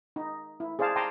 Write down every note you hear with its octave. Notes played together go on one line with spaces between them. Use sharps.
D#4
E4
G#4 C5 D5 F5 A5
G5 A5 A#5 C6 D6 D#6